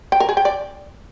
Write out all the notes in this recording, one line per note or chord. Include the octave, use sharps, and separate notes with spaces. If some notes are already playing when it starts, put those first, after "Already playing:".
G5
A#4
G#4
G5
D5